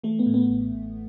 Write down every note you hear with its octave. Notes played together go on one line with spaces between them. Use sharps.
E3 A3
B3
A2
B3
A1
A1